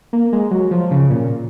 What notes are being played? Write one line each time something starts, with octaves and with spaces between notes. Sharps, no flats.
A#3
G#3
F#3
F3
C#3
A#2